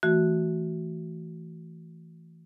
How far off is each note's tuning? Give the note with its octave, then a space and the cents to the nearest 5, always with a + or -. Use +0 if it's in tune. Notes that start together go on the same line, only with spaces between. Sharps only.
E3 +0 A3 +10 F#4 +0